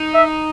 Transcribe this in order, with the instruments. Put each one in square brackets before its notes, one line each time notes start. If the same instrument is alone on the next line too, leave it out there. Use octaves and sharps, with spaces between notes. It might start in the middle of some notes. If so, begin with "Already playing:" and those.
Already playing: [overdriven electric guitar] D#4
[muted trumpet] E5